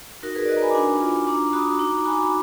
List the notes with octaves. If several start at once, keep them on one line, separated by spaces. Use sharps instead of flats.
D#4 F#4 A#4
G#4 B4
D5
F#4 B4 D#5
A#5
G#5 B5
D6
D4 G#5 B5
F4
D4 A#5 D6
F#4 B5 D#6
D#4 A#5 D6
F#4 G#5 B5
D6
B5